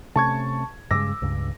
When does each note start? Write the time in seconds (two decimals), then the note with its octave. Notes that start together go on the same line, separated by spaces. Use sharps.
0.16 C3 A3 C#4 A5 C#6 G#6
0.91 G2 C#3 G#3 D6 E6 A#6
1.22 C#2 G2 C#3